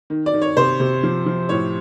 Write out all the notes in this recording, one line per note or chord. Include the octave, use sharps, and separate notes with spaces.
D#3
D5
D#3
C#5
C3 C5
C3
F3
F3
A2 C#5